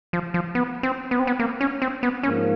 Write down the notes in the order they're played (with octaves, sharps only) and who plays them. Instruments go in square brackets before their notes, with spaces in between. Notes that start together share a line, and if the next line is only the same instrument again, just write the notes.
[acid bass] F3
F3
B3
C4
B3
C4
B3
A#3
C#4
C4
B3
[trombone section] G#2 F3 A#3 [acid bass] C#4